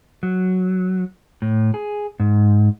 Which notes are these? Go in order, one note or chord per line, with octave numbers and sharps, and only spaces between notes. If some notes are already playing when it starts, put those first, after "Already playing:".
F#3
A2
G#4
G#2